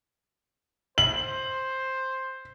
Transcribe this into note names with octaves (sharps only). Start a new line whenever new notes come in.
C5 F#7